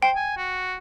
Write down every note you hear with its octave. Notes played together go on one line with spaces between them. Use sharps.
C5 G5
G#5
F#4